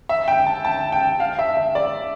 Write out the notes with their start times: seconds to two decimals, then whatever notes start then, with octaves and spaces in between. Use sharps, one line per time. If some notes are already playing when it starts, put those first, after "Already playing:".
0.09 E5
0.28 G5
0.47 A5
0.65 A5
0.92 G5
1.20 F5
1.39 E5
1.57 E5
1.75 D5